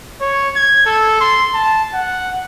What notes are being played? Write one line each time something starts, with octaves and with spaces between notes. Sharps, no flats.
C#5
G#6
A4
C6
A5
F#5